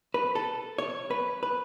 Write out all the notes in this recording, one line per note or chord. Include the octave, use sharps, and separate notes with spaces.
B4
A4
C#5
B4
B4